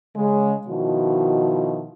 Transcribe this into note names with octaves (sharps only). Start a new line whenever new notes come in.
C#3 G#3
B2 D#3 F3 E4 F#4